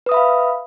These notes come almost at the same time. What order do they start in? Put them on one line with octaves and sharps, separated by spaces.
B4 D#6 E5 B5 F5